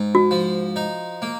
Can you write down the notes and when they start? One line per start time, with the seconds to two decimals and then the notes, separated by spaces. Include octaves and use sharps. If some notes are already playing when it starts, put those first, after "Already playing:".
Already playing: G#2
0.15 F#4
0.31 F3
0.76 D#4
1.22 A#3